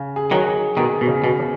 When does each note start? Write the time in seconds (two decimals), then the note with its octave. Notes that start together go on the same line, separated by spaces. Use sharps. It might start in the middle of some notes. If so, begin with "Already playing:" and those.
Already playing: C#3
0.16 G#4
0.31 D#3 F#3
0.47 G#4
0.77 B2 D#3 G#4
1.01 B2
1.08 C#3
1.24 B2
1.40 C#3